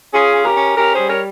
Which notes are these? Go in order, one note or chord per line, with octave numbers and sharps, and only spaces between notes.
C#4 F4 G#4
C#4
G4 A#4
C#4
C#4 G4 A#4
G#4 C5
G3
A#4 C#5